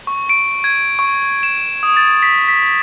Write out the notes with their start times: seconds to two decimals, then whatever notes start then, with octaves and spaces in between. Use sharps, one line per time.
0.07 C#6
0.29 D7
0.64 G#6
0.99 C#6
1.43 E7
1.83 D#6
1.97 A6
2.23 B6
2.49 B6